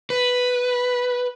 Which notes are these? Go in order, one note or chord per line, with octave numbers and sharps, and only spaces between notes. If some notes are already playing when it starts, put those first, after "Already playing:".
B4